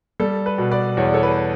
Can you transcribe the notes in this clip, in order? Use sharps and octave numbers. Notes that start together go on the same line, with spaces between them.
G3 A4
B4
B2
B4 D5
E2 C#5
D5
A4 C#5
B4